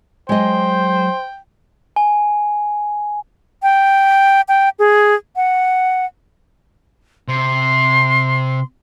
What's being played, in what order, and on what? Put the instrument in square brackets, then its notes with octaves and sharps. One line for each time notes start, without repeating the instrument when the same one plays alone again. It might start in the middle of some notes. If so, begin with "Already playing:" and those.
[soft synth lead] F#3 [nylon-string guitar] G#3 D#5 [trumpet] C5 [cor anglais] G5
[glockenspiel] G#5
[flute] G5
G5
G#4
F#5
[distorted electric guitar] C3 [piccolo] C6